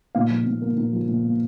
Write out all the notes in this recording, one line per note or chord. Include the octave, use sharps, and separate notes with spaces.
A#2 F5
F3
A#2
A#3
A#2
F3
A#2
A#3